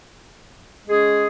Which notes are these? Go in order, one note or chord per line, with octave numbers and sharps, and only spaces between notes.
G#3 C#4 G#4